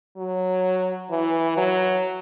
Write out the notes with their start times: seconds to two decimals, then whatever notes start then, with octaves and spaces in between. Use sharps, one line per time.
0.17 F#3
1.11 E3
1.57 F#3